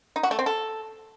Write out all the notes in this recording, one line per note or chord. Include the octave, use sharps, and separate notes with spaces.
D#4
F#4
A3
C4
A4